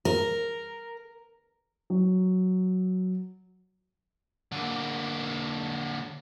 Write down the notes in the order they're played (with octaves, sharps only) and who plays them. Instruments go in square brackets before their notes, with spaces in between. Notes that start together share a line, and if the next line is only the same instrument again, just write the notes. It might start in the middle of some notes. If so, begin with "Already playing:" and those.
[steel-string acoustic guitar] A#4
[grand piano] F#3
[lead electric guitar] D3 A#3